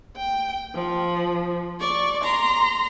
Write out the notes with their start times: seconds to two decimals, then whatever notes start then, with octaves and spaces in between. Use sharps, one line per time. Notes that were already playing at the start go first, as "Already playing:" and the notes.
0.17 G5
0.75 F3
1.80 D5 C#6
2.24 A#5 C6